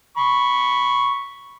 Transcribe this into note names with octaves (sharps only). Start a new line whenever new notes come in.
B5 C#6